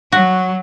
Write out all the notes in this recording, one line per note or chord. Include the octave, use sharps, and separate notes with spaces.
F#3 F#4